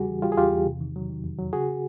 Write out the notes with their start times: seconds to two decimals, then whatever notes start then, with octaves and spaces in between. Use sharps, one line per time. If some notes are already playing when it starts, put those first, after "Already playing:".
Already playing: E2 C#3 G3 F#4 G#4
0.09 E3
0.22 G3 F4 G4
0.32 G#4
0.37 E2 F4 G4
0.52 E2
0.66 C3
0.81 D#3
0.96 F#3
1.09 D#3
1.24 F2
1.39 F#3
1.53 C#3 F#4 G#4